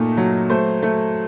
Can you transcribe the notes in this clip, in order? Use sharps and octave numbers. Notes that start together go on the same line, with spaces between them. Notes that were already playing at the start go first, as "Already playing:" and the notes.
Already playing: A#2 A3 D#4
F#3
A3 C5
A3